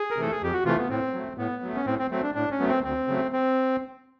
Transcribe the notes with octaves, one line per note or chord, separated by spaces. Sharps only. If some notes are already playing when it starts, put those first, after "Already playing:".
Already playing: G#4
A#4
C3 E3 A3 A4
G#4
F2 G4
F#4
C3 E3 A3 F4
B3
A2 C4
F#3 A3
A2 B3
F#3 A3
C#4
A2 C4
C4
F#3 A3 C4
D4
A2 D4
C#4
F#3 A3 B3
C4
D2 C4
C#3 F#3 A3
C4